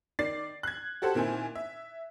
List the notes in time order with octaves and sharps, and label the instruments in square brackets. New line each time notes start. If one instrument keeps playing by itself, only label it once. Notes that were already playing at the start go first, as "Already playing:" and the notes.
[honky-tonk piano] D#3 D5 A6 C7
F#6 G#6
F#4 G4 A4 C5 F#5
A#2 D#3 C4 E4 G#5
E5